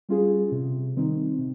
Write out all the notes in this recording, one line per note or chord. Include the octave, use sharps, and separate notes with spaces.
G3 C#4 F4 G#4
C3
D#3 G3 C4 D#4
C3